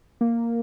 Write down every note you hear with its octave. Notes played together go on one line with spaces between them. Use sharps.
A#3